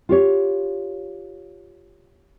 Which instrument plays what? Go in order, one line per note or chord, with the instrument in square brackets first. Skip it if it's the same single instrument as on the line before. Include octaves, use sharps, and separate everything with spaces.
[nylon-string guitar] F4 G4 C#5